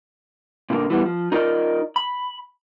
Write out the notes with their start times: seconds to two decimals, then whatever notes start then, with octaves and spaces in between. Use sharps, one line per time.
0.70 A#2 D3 D#3 G3 A#3
0.90 E3 G3 B3
1.05 F3
1.32 D#4 F4 A#4 C5 D5 D#5
1.96 B5